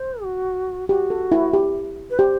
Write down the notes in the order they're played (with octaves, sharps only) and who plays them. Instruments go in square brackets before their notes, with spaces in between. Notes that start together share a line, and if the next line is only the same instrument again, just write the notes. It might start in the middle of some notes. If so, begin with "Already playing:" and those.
Already playing: [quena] C5
F#4
[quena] F#4 [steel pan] G4
[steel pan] A4
E4
G4
[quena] B4
[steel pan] G4 [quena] C5